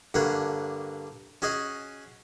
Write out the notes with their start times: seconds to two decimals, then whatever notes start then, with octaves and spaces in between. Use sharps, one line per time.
0.14 G2 D3 A#3 C#5 F#5
1.42 C#4 F#4 G#4 D#5 F#5